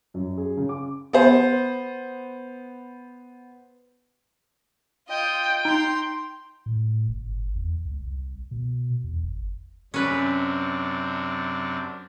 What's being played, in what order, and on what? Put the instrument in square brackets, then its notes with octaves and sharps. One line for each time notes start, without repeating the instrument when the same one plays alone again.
[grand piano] F#2
G#4
C#3
D6
[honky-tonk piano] B3 C5
[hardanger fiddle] F4 D#5 [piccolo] G5
[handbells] D#4 [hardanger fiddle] A#5 C6
[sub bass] A2
G1
E2
C#2
C2
B2
E2
G1
[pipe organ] F#2 C3 D4 [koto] C#4 B4